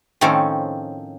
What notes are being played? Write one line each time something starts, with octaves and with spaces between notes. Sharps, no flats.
A2 D#3 F3 C4 C#4 A4